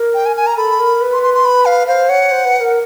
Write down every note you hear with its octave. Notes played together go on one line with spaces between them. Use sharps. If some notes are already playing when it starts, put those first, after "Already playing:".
Already playing: A#4
G5
G#5
G#5
A#5
A4 B5
A#4
B4
C6
C6
C6
B5
F5
C5 F5
C#5 F#5
C5
B4
A#4